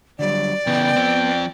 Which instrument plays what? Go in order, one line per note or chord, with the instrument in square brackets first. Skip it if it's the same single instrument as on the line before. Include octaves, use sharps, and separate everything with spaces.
[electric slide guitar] D3 F#3 G3 [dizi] D5
[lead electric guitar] C#3 E3 [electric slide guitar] B3 [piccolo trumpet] G5
[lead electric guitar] F3 C4